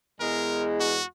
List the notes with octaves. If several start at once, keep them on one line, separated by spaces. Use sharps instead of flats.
E2 G#3 A#4
F#4